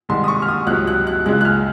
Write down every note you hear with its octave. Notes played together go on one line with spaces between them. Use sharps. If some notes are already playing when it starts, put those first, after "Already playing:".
C2 C3 D#3 G#3 C6
D#6
C#6
F6
D#6
C#2 C3 F#3 F#6
F#6
F#6
C#2 C#3 G#3 F#6
F#6
F6